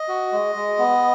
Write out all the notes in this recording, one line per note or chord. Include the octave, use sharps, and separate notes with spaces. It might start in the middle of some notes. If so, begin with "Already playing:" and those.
Already playing: D#5
F#4
G#3
G#3
B3